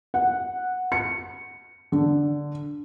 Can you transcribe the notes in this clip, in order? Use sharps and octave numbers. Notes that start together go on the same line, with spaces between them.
F#5
C#7
D3